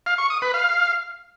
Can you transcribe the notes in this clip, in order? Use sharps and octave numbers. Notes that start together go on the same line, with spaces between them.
F5
C#6
D#6
B4
F5